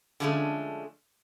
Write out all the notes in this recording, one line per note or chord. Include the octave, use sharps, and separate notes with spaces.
D3 F3 G#3 A3 C#4